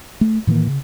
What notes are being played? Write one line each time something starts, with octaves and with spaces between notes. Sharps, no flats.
A3
A2 D#3 E3 A#3
C#3